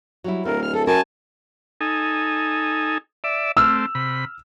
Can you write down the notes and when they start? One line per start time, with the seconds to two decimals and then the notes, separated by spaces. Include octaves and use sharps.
0.24 F#3 G3 E4
0.45 D1 A3 A#4
0.62 F6
0.73 G#4 A4
0.87 F#2 A#4 G#5 A5
1.81 D#4 A4 G#5
3.24 D5 E5
3.57 A3 C4 E6 F6
3.95 C3 B5